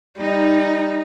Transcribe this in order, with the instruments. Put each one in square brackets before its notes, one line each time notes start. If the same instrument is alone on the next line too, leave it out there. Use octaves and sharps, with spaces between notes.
[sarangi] G3 [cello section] D#4